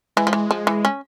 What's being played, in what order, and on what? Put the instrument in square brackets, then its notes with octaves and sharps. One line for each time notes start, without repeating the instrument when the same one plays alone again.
[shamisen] E3 [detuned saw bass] G#3
[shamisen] F3
E3
F3
E3
C#4